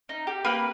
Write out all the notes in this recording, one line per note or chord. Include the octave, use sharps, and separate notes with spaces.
D#4
G4
A#3 B4